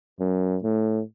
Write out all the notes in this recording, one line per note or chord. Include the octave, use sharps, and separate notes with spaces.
F#2
A2